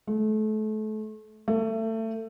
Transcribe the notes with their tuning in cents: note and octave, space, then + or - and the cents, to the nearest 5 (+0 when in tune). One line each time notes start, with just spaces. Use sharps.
A3 -30
A3 +25